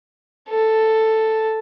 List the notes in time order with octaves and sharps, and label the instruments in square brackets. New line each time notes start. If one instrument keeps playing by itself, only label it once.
[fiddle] A4